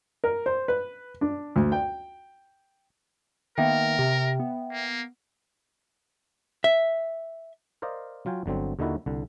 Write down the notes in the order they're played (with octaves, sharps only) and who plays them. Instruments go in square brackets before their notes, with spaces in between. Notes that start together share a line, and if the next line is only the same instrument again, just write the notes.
[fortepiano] A#4
C5
B4
D4
D2
G5
[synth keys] D#3 A#3 B3 [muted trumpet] A#4 [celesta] E5 G5
[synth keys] C3
B3
[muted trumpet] A#3
[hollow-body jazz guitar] E5
[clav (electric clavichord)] A#4 C5 D5 D#5 F5
F#3 F4 G5 G#5
G1 D3 F#3 C4
D#2 D3 D#3 D#4 E4 F#4
C2 D3